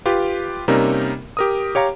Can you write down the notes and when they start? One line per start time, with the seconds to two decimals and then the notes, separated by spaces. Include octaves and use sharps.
0.06 F4 G4 B4
0.68 C3 G3 A#3 C#4 D#4 A#4
1.37 G4 A#4 D#6
1.75 G4 C#5 F5 A#5